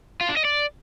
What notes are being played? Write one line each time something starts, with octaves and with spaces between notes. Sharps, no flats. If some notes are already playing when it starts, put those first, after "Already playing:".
F4
D4
D#5
D5